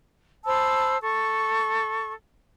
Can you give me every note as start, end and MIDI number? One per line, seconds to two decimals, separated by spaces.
0.46 0.96 72
0.46 0.96 81
0.46 0.96 83
0.46 0.96 88
1.01 2.12 69
1.01 2.12 85